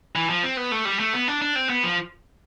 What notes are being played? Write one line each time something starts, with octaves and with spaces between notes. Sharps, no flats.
E3
F3
C4
B3
A3
G3
A3
B3
D4
D4
C4
B3
F3